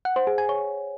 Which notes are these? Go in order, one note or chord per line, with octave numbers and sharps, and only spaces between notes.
F#5
C5
G#4
G#5
C#5